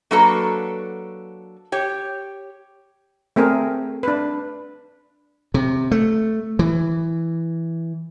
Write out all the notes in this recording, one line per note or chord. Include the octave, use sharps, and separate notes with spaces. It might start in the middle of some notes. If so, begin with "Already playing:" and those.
F#3 A#3 D4 F#4 A4 B4
G4 C#5
A3 C4 G#4 A#4
D4 B4
C3
A3
E3